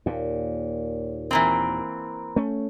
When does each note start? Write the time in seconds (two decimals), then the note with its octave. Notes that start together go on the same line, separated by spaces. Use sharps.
0.06 D#2 A#2
1.31 E3 A#3 C4
2.36 A3 C#4